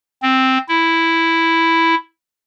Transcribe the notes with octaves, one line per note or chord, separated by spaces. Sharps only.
C4
E4